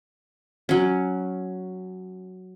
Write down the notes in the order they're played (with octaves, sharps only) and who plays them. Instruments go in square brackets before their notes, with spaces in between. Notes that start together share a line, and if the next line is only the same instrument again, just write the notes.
[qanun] F#3 C#4